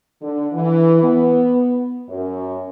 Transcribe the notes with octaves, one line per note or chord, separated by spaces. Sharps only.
D3
E3
B3
F#2